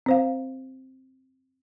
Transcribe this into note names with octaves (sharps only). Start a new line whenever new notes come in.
C4 C5 F5